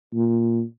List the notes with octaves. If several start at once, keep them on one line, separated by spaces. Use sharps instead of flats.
A#2